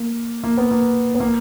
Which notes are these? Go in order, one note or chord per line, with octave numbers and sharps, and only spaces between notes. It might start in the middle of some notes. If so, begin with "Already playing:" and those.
Already playing: A#3
A#3
B3
A#3
B3
A#3